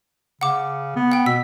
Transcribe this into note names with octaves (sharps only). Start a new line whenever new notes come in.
C#3 F#5 D6
B3
F#5 G5
B2 E6 B6